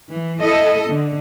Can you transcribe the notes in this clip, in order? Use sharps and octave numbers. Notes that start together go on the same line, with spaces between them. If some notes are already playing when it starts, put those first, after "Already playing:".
E3
E4 A4 D#5
D3